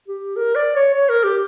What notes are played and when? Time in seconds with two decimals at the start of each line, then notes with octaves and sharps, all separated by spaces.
0.08 G4
0.37 A#4
0.56 D5
0.76 C#5
0.94 C#5
1.09 A#4
1.24 G4